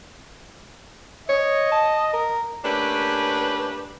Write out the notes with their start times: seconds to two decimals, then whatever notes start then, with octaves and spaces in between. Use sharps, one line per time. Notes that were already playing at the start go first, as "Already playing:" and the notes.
1.29 C#5 D#5
1.72 A5
2.13 A#4
2.65 A3 A#3 C#4 D4 G4 B4